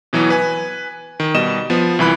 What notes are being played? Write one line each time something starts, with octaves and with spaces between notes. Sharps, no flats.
B2 E3 F#3 B3
B4 G#5
D#3
B2 G3 D#5 E7
F3 B3
C2 E3 B5 F#6